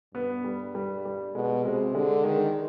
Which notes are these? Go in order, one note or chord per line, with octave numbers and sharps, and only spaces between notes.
G2 B3
G3
G3
G3
B2 G#3
C3 G#3
D3 G#3
D#3 G#3